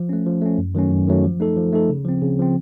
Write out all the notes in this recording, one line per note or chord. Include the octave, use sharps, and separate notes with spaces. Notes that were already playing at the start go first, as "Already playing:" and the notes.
Already playing: F3
A3 C#4
F3
A3 C#4
F#2
D#3 F#3 A3 C#4
F#2
D#3 F#3 A3 C#4
F3
A3 D#4 A4
F3
A3 D#4 A4
C#3
F3 C4
C#3
F3 C4